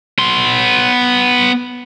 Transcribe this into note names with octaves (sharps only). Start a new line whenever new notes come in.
B3 C6